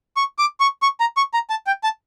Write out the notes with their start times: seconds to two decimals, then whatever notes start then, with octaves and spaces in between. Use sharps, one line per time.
0.17 C#6
0.39 D6
0.60 C#6
0.82 C#6
1.00 A#5
1.17 C#6
1.34 A#5
1.50 A5
1.67 G5
1.83 A5